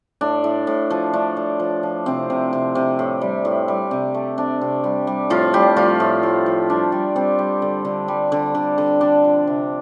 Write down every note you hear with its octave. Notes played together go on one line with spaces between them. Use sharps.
A2 D4
A2
A2
F3
A3 D4
A3
F3
F3
C3 C4
C3
C3
C3
A2
G3
A2
G3
C3
A3
C3 D4
C3
G3
G3
A2 F3 F4
A2 G3 G4
A2 F3 F4
A2
A2
F3
G3 D4
G3
G3 C4
G3
D3
D3
G3
D3
D3
D3
D3 D4
F3
C3